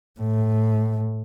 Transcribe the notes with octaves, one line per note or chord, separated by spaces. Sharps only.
A2